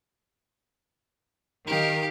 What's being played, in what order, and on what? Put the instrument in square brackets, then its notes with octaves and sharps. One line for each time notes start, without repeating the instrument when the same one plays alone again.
[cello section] D#3 A#4 [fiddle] G4 F5